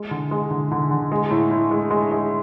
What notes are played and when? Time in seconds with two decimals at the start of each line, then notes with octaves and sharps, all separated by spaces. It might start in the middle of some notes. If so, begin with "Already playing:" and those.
Already playing: G#3
0.11 D3
0.31 G#3
0.50 D3
0.71 D3
0.91 D3
1.12 G#3
1.31 A2
1.51 A2
1.71 G#3
1.91 G#3
2.11 G#3